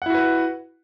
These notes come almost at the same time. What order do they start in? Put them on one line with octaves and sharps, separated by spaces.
F#5 E4 F#4 B4